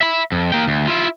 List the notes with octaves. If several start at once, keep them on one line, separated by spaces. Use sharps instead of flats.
E5 B5
F2
A#3 G5
D2
E4 F4